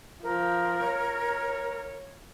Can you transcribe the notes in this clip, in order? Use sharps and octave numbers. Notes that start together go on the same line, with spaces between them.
F3 A#4
C#5